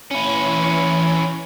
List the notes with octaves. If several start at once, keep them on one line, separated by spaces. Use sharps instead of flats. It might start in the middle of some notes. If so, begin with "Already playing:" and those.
E3 C#4 E4 C#5